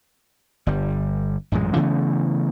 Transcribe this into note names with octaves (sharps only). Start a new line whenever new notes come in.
G1 G3
A1 F#2 A#2 G#3
C#3 E3 A3 B3